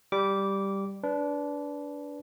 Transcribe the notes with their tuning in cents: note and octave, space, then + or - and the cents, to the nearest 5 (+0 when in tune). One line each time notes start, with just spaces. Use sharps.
G3 +0 D6 -15
D4 -20 B4 +0